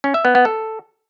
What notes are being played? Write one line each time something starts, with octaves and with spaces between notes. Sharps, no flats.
C#4
E5
B3
B3
A4